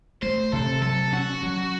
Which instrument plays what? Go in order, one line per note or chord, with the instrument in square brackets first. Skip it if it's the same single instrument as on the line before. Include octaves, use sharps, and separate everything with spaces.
[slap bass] A3 [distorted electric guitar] C5
[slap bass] C3 [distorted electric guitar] A4
[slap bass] F#3 [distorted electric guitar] A4
[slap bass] C#4 [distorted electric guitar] F#4
[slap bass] F#3